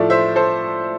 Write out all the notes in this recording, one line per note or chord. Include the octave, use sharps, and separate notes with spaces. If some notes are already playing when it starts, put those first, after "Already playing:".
Already playing: A2 F3 A3 D5
C5 E5
A4 C5